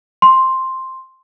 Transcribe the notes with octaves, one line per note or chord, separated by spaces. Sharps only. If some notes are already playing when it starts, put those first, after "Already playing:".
C6